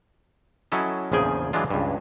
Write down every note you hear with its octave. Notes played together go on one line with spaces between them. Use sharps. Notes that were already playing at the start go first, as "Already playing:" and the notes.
F#3 C#4 E4 A4 D#5
A#1 E2 C#3 F3 G#4 G5
E3 F#3 G#3 D4 F4
C#2 G2